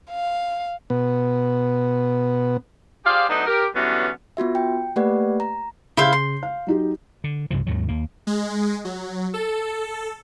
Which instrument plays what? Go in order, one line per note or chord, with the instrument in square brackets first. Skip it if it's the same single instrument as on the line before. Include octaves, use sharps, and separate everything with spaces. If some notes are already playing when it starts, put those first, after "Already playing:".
[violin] F5
[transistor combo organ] B2 B3
[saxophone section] G4 G#4 C5 D5 F5
F#3 A3 B3 D4 D#4
G4 A#4
D3 E3 F#3 G3 B3 C#4
[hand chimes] B3 F4 F#4 E5
G5
A3 A#3 G4 B4 D5 F#5
A#5
[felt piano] C#3 G#4 G6 [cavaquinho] E4 C5 F5
[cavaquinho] C6
[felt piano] F5
F#3 D#4 G4
[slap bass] D3
C2 G2 C#3 F3
D#2 G#2 D#3 F#3
D#2 A#3
[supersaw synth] G#3
F#3
A4